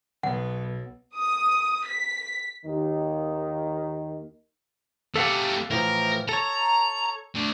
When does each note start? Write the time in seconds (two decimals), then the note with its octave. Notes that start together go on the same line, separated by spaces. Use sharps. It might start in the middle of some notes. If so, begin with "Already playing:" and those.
0.23 B1 B3 F#5
1.16 D#6
1.86 B6
2.65 D#2 D#3
5.16 A3 G4 A4 F5 F#5
5.71 A2 E3 F3 A#4
6.29 A4 C#5 A#5
7.35 D3 A3